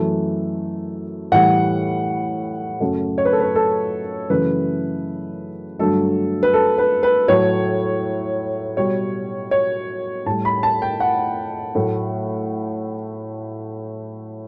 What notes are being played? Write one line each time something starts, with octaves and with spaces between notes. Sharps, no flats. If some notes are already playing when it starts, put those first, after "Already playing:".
Already playing: F#2 E3 A3
A2 E3 G3 F#5
F#2 C#3 F#3 A3
C#5
B4
A4
B4
A4
F#2 C#3 E3 A3 B4
G2 D3 F#3 A3 A4
B4
A4
B4
B4
A2 F#3 A3 C#5
B2 G3 C#5
C#5
A2 G3 A5
B5
A5
G5
F#5
A2 F#3 A3